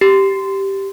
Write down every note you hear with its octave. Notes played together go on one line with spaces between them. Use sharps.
G4